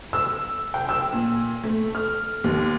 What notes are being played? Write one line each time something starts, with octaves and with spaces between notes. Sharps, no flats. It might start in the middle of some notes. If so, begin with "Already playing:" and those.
E6
G5
E6
A#2
A3
F6
D#2